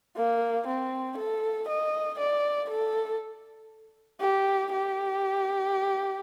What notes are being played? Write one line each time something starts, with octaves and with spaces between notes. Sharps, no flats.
A#3
C4
A4
D#5
D5
A4
G4
G4